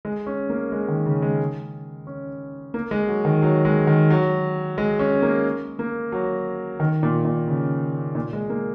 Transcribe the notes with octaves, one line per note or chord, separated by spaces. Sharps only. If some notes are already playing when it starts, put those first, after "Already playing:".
G#3
C#4
A#3
G#3
D#3
C#3
G#3
C#4
A#3
G#3
F#3
D#3
F#3
G#3
D#3
F#3
G#3
C#4
A#3
A#3
F#3
D#3
A#2
A#2
C#3
A#2
G#3
A#3